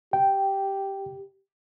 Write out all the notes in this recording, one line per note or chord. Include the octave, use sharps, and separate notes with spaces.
G4 G5